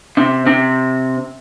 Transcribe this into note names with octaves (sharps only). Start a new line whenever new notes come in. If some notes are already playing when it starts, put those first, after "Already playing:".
C3
C3